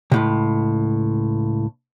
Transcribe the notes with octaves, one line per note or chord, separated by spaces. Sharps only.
C#2 A2 C3